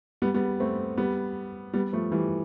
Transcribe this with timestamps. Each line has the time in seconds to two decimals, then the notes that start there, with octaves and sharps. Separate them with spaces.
0.22 G3 B3
0.34 G3 B3
0.60 A3 C4
0.97 G3 B3
1.73 G3 B3
1.93 F3 A3
2.12 E3 G3